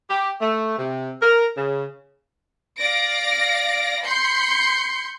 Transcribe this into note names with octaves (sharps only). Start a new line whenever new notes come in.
G4
A3
C3
A#4
C#3
D5 F5 A#6 D7
B5 C6 G6 C7 C#7